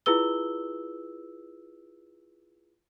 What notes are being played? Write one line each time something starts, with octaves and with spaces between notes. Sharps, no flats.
E4 F4 G#4 B4 E6 G7